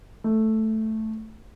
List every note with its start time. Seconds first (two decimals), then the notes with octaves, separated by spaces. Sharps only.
0.24 A3